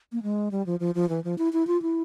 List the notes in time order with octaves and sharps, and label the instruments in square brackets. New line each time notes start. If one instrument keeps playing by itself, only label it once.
[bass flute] A#3
G#3
G3
F3
F3
F3
E3
F3
E4
E4
F4
E4